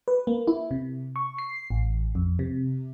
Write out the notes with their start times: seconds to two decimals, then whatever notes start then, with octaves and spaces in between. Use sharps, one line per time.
0.08 B4
0.27 A#3
0.47 E4
0.71 C3
1.16 C#6
1.39 C7
1.70 A1
2.15 F2
2.39 C3